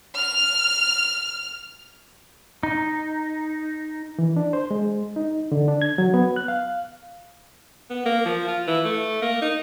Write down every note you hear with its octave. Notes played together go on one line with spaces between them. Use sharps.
F6 F7
D#4
E3
D4
C5
G#3
D#4
D3
D4
G#6
F#3
B3
F#6
F5
B3
A#3
F3
F4
E3
A3
A#3
D#4